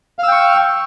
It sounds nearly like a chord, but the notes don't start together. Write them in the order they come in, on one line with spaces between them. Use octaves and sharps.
F5 E6 G5 C#6